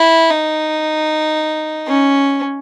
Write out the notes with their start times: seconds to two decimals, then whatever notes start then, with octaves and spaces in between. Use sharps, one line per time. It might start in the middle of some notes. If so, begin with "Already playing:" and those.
Already playing: E4
0.30 D#4
1.87 C#4